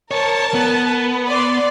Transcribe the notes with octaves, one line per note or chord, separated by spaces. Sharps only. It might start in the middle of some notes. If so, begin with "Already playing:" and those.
A#4 C5 C#5 A5
B3
D5 C6